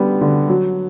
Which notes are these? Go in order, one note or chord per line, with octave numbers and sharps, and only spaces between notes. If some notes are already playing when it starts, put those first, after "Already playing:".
Already playing: D3 G3 B3
D3
F#3